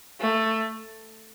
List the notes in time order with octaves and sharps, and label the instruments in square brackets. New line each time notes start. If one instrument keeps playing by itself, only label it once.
[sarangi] A3